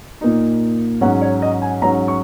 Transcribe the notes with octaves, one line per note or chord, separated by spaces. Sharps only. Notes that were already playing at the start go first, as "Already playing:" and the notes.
A#2 A#3 D#4
G#2 F#3 C#4 F#5
C#5
D#5
G#5
G#2 F#3 C#4 A#5
C#6